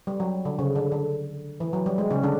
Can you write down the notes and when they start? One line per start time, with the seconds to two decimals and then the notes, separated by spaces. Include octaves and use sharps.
0.07 G3
0.20 F#3
0.45 D3
0.59 C#3
0.76 D3
0.92 D3
1.60 E3
1.73 F#3
1.86 G3
1.98 G#3
2.11 C#3 C#4
2.23 D3 D4